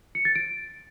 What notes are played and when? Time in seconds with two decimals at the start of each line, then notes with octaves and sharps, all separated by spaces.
0.15 C#7
0.25 A6
0.35 D7